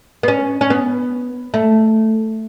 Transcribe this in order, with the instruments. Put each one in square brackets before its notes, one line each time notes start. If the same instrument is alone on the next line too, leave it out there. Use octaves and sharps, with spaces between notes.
[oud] B3
C#4
C#4
B3
A3